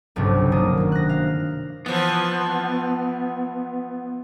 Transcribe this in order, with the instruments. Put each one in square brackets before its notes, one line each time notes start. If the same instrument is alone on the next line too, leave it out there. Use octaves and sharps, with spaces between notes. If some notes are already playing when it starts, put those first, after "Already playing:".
[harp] F#1 B1 G2 C3 D4
D#3 A#3 D4 D#6
C3 F#3
F#6 A#6
F5
[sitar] E3 F3 [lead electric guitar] B3